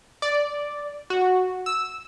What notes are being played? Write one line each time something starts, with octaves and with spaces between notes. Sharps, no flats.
D5
F#4
E6